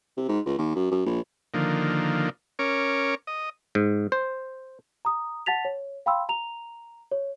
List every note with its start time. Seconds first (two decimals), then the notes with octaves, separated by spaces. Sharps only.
0.17 C3
0.28 G#2
0.46 C#2
0.58 D#2
0.75 F#2
0.92 F#2
1.06 A#1
1.54 D3 D#3 F3 A#3
2.59 C#4 A#4 C#5 D6
3.27 D#5
3.75 G#2
4.12 C5
5.05 A#5 D#6
5.46 F#5 A5 A6 B6 F7
5.65 C#5
6.06 F5 G5 B5 C6 E6
6.29 A#5 F7
7.12 C#5